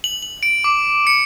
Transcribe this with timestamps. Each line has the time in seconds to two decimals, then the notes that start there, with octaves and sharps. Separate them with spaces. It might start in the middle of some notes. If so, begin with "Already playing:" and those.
0.04 F#7
0.23 F#7
0.43 D7
0.64 D6
1.07 C#7